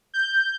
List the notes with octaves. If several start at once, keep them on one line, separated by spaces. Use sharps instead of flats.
G6